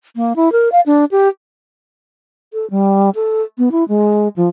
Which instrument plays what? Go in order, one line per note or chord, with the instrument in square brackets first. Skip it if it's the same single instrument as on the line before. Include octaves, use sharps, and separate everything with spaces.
[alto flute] A#3
E4
A#4
F5
D4
G4
[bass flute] A4
G3
A4
B3
E4
G#3
F3